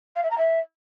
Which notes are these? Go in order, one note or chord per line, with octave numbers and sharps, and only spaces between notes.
F5
E5
A#5
E5